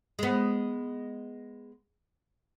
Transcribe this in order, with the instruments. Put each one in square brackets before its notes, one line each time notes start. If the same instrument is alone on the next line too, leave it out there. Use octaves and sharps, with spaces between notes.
[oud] G#3 B3